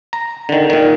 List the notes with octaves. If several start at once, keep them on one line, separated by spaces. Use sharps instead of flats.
A#5
D3 D#3
A#2 D#3